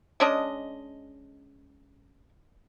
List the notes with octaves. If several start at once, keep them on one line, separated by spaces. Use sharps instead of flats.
G#3 C#4 D4 D#5